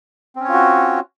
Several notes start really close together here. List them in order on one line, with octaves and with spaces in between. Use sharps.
C4 C#4 C#5 F4 F#4